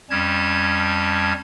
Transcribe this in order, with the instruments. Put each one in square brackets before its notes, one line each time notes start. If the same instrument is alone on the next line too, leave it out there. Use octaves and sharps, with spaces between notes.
[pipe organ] F2 G3 C#4 A5 G#6